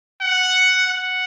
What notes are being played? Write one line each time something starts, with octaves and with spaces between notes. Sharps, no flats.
F#5
F#5